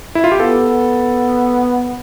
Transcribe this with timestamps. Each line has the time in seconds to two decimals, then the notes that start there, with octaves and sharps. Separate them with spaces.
0.15 E4
0.24 F4
0.32 G4
0.40 B3 A4